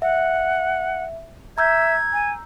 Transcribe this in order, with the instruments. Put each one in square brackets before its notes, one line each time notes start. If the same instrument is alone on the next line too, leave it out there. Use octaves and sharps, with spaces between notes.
[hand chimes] E5 [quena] F#5
[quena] E5 [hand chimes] A#5 E6 G6 [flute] G#6
[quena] G#5